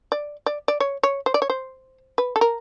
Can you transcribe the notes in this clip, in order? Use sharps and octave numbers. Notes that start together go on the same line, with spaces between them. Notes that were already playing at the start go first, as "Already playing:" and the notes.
D5
D5
D5
C#5
C#5
C5
D5
C#5
C5
B4
A4
A#4